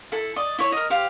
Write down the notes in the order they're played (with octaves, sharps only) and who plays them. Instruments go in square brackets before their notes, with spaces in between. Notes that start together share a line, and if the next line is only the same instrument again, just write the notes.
[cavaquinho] E4 A4
D5 D#5
E4 C#5 C#6
A#4 D#5
G4 C5 F5